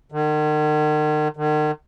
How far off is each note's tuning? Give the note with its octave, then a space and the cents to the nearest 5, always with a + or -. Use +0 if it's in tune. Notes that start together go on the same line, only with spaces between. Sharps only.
D#3 -40
D#3 -40